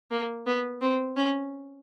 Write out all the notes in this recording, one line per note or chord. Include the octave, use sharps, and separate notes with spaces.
A#3
B3
C4
C#4